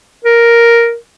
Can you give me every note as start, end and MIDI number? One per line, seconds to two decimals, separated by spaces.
0.25 0.96 70